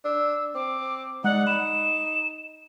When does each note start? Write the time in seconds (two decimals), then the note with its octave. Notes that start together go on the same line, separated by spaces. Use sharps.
0.05 D4 E6
0.55 C4 D6
1.24 G#3 D#4 D5 F#5
1.47 B5 E7